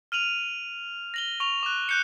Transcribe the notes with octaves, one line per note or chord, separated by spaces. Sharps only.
F6 D#7 F7 F#7
A#6 F#7 G7
C#6 F7
D6 F#6
F#6 G6 C#7